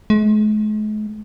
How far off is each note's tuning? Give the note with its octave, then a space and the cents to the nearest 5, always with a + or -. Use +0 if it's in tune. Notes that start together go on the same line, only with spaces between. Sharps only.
G#3 +45